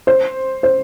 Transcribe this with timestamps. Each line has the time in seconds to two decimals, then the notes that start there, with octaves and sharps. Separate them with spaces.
0.07 C5
0.63 C5